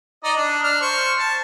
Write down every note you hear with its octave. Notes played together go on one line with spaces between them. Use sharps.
D#4 D5 D#5
D4
D4 F6
C5 C#6
A5